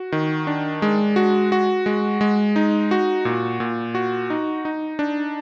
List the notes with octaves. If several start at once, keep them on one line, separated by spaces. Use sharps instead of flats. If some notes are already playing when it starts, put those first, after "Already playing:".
Already playing: F#4
D#3
D4
G#3
F#4
F#4
G#3
G#3
D#4
F#4
A#2
A#2
F#4
D#4
D#4
D4